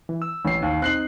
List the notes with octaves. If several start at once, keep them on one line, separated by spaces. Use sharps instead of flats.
E3
E6
A1 C7
D#2
C4 D#4 F#6 C7 F#7